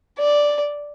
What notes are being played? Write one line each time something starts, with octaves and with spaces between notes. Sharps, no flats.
D5